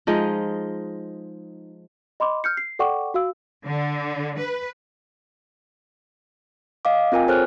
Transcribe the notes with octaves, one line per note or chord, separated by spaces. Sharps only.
F3 G#3 D#4
D#5 B5 C6 D6
F6 G6 C#7
C7
A4 D5 F#5 G5 C#6 D6
F#4 F5 E6
D3
B4
D#5 F5 D6
C4 F4 A#4 G5 G#5
G#4 A4 C5 C#5 F6 F#6